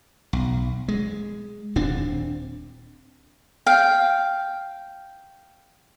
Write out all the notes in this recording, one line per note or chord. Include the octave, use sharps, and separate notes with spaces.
B1
G#3
D#1 C4 D4
F5 G5